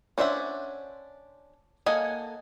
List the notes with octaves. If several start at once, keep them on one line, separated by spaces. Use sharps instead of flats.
C#4 D4 C5 E5 F#5
A#3 A4 D#5 F#5 G#5